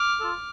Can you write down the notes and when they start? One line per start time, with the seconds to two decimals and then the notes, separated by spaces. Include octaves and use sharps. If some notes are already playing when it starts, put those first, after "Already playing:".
Already playing: D6 F6
0.20 F4 A4